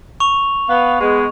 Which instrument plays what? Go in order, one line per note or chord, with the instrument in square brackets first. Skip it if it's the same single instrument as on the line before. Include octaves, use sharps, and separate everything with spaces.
[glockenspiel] C#6 F7
[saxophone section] B3 F5
G#3 B3